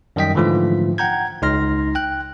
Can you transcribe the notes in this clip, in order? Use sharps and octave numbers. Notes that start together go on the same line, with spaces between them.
F#2 D#3 G3 D#5 G5 B6
G#2 D3 E3 F3 A3 F4
F#5 G5 A#5 G6 G#6
C#2 D#4 C6 F6 A#6
G5 F#6